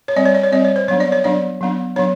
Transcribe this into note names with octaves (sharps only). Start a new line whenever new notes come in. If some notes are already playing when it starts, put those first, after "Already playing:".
C#5
G3 C4 D5
C#5
D5
C#5
G3 C4 D5
C#5
C5
F#3 B3 D4 C#5
D5
C#5
F#3 B3 D4 D5
F#3 B3 D4
F#3 B3 D4 C#5